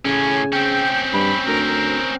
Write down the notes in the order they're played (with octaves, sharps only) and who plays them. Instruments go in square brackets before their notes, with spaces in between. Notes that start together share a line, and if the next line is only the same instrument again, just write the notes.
[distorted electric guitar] A2 C#4 [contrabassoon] C#3 [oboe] G#5
[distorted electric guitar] C4 C#4 [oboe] G5
[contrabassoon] G2 [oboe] B5
[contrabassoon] D2 [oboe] A#4
[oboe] A#4